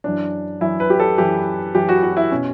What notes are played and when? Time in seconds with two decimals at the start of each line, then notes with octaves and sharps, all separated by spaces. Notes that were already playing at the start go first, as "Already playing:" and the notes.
0.04 F#2 E3 D4
0.61 F#2 E3 E4
0.80 B4
0.90 G4
1.00 A4
1.18 F#2 E3 G4
1.75 F#2 E3 G4
1.89 F#4
2.03 F#4
2.17 E4
2.31 B2 C#4